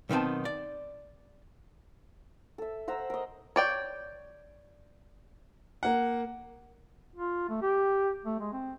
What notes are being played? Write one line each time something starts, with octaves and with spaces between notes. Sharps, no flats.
B1 D#3 B3 C4 A5
D5
A4 E5
C5 F#5 A#5 E6
A#4 D#5
C#5 D5 G5
A#3 F#5
F4
A3
G4
A3
G#3
C4